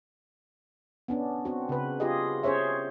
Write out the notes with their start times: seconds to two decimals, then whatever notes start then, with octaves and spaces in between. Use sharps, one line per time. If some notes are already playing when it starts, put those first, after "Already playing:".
1.08 B3 C#4 D4
1.45 C4 F#4
1.69 C#3 B4
2.00 F4 G4 G#4 D#5
2.43 C#4 G#4 C5 C#5 E5